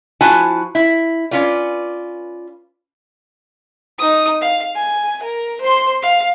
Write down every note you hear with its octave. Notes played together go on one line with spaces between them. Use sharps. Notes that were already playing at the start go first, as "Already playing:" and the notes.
F3 E4 F#4 B4 G#5 A5
E4
C#4 F4 B4 D5
D#4 D#6
F5
G#5
A#4
C5 C6
F5